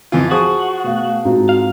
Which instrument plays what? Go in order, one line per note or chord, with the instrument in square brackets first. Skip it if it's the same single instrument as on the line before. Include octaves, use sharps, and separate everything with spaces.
[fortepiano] F2 E3 F4
[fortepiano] F3 G#4 D#6 [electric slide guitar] F#4
[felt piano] B2 [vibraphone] A3 F5
[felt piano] G#2 C4 F4 [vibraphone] F#4 A#5
[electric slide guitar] F5